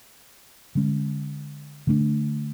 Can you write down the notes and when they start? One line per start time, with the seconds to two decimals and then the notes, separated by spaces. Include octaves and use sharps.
0.75 D3 G#3 C#4
1.87 D3 A3 D4